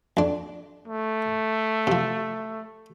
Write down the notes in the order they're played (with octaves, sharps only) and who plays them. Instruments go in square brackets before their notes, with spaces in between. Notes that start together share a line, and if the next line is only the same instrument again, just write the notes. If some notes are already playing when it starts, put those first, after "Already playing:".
[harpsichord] F2 D4
[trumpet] A3
[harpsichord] C3 F3